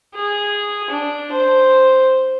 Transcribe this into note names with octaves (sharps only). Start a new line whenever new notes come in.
G#4
D4
C5